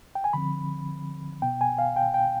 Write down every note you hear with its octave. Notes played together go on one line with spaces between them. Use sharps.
G5
G#5
D3 F3 C4 B5
B2 B3 G5
G#5
F5
G5
G5